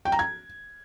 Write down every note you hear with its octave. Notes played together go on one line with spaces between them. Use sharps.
G5
A#5
G#6